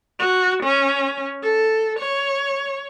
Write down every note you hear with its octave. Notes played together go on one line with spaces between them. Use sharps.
F#4
C#4
A4
C#5